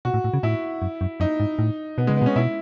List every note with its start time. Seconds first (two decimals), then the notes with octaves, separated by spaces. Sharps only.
0.05 B2 F#4
0.14 A2
0.24 A2
0.34 C#3
0.43 A2 E4
0.82 F#2
1.01 F#2
1.20 F#2 D#4
1.40 G#2
1.59 A2
1.98 B2 B3
2.07 C#3 G#3
2.17 B3
2.22 B2
2.26 C#4
2.36 B2 E4